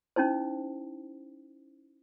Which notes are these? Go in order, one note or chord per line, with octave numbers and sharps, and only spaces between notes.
C#4 D#4 E4 C5